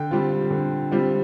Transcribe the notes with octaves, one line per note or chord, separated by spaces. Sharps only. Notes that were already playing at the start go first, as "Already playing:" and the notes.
Already playing: D3 G5
G3 C4 F4
D3
G3 C4 F4